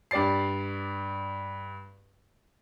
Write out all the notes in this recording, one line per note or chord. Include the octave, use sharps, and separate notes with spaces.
G2 G4 D5 A6 C7